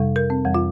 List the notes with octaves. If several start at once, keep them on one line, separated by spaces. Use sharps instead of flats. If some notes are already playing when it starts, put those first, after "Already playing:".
Already playing: F2 C3 G3
A#4
C4
F2 E3 G3
F4